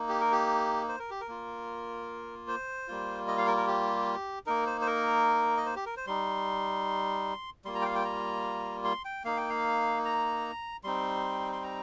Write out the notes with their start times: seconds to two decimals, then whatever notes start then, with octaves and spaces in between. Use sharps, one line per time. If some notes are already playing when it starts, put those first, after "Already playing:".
Already playing: A#3 D#4
0.09 G4
0.20 A#4
0.32 G4
0.88 C5
0.99 A#4
1.10 G4
1.21 A#4
1.28 A#3 F4
2.48 C5
2.88 G3 A#3 F4
3.28 D#5
3.38 F5
3.47 A#4
3.57 A#4
3.67 G4
4.46 A#3 D#4 A#4
4.66 C5
4.81 C5
4.87 A#4
5.57 D#5
5.66 C5
5.76 G4
5.86 A#4
5.97 C5
6.07 G3 D#4 C6
7.65 G3 A#3 F4 C6
7.75 A#5
7.82 G5
7.86 F5
7.95 G5
8.05 A#5
8.84 C6
9.05 G5
9.24 A#3 D#4 F5
9.37 G5
9.50 F5
10.05 A#5
10.84 G3 C4 D#4 C6
11.52 C6
11.63 A#5